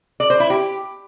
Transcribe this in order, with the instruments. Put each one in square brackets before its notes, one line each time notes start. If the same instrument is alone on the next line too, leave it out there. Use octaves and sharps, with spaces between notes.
[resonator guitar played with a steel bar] D5
C5
E4
G4